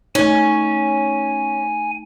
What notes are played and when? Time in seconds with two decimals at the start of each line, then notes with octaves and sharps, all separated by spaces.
0.15 A3 C#4 D#4 G#5